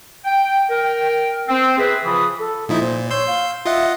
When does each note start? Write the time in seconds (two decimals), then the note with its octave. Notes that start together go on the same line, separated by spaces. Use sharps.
0.25 G5
0.69 A#4 G5
1.48 C4
1.78 G#4 B4 E5
2.04 C#3 E3 F3 F4 B5 D#6
2.39 A4
2.69 A#2 F3 D#4 E4
2.81 A#2 C5
3.11 C#5 C6 E6 G6
3.27 F5
3.65 F4 D#5 E5 F#5